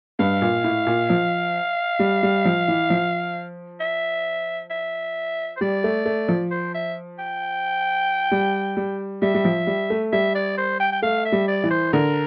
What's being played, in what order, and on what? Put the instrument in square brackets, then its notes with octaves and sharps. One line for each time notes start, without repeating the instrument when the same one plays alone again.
[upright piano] G2 [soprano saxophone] F5
[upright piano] A#2
A2
A#2
F3
G3
G3
F3
E3
F3
[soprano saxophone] E5
E5
C5
[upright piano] G3 [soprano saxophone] D5
[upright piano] A3
A3
F3
[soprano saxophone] C5
E5
G5
[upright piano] G3
G3
[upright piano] G3 [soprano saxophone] E5
[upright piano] G3
F3
G3
A3
[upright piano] G3 [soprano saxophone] E5
[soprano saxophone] D5
C5
G5
G5
[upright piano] A3 [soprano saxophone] F5
[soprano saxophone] E5
[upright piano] G3
[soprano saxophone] D5
[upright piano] E3
[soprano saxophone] C5
[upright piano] D3 [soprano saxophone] A#4